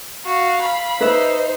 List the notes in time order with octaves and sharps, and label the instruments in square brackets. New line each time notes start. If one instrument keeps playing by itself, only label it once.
[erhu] F#4 [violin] F5
[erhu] B5
[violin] D#4 C5 [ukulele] B4 E5